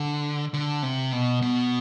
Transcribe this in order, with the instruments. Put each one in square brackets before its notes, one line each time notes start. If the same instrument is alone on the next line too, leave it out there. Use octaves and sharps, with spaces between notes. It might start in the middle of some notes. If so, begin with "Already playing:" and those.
Already playing: [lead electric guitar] D3
D3
C3
B2
B2